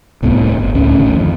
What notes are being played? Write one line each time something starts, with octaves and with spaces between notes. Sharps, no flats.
D1 C2 A2 B3
G1
C#2 A2 C#4
D#1 G#1 D2 D#3
F2